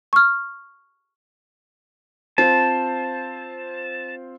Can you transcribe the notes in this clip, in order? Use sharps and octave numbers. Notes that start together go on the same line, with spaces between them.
C#6 F6
C4 F4 C5 A5